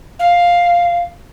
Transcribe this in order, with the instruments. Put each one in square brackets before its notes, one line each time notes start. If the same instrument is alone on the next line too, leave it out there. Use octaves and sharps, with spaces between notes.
[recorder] F5